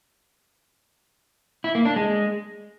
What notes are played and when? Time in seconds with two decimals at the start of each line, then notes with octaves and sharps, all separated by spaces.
1.64 E4
1.75 A#3
1.86 D4
1.96 G#3